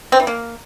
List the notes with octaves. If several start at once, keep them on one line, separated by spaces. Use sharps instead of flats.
C4
E3
A#3